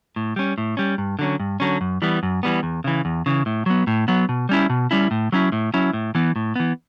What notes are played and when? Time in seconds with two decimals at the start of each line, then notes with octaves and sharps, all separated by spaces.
0.16 A2
0.36 G3 C#4
0.58 A2
0.77 G3 C#4
0.98 G2
1.19 D3 F#3 C#4
1.40 G2
1.60 D3 F#3 C#4
1.81 F#2
2.02 E3 G3 B3
2.23 F#2
2.43 E3 G3 B3
2.63 E2
2.84 C#3 E3
3.05 E2
3.26 C#3 E3
3.46 A2
3.66 F#3 B3
3.87 A2
4.08 F#3 B3
4.29 B2
4.49 G3 C#4 E4
4.70 B2
4.91 G3 C#4 E4
5.11 A2
5.32 F#3 C#4 E4
5.52 A2
5.74 F#3 C#4 E4
5.93 A2
6.15 E3 B3
6.36 A2
6.56 E3 B3